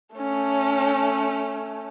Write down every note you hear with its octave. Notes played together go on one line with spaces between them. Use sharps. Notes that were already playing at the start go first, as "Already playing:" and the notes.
A3 C#4